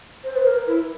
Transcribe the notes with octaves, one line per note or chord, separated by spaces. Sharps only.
C5
B4
A#4
E4